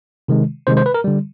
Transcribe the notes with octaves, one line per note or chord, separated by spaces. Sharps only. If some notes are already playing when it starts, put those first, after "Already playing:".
C3 D#3 G#3
C3 D#3 G#3 C5
C5
B4
A#4
D3 G3